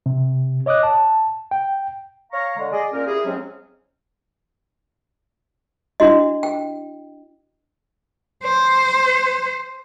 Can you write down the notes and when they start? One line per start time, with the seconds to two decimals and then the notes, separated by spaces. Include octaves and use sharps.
0.06 C3
0.66 C#5 D#5 D6 D#6 F#6
0.83 A5
1.51 G5
2.32 C#5 F5 A#5 C#6
2.57 D3 G#3
2.72 G#4 D5 D#5
2.93 A#2 C#4 A#4
3.07 E4 G4 G#4
3.25 F2 G#2 F#3 G#3 C4 C#4
6.00 D4 E4 F#4 D#5
6.43 G5
8.44 C5